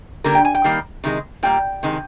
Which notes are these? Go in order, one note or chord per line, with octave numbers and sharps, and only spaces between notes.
D3 G3 A#3 A#4
G5
G#5
G5
D#3 G3 A#3
C3 D#3 G#3
A#2 G3 A#3 G5
C3 D#3 G#3